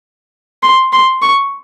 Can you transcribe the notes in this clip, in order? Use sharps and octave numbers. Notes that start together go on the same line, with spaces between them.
C6
C6
C#6